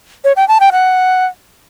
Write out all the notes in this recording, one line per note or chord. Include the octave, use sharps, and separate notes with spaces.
C#5
G5
A5
G5
F#5